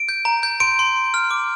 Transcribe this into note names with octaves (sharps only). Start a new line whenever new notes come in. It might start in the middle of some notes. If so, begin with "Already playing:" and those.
Already playing: D7
G6
A#5
G6
C6 D7
C6
C6
F6
D6